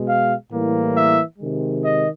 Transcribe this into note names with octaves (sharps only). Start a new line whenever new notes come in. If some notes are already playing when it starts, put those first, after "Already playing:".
Already playing: B2 G#3
F5
A2 E3 G3 A#3
E5
C3 D#3 G#3
D#5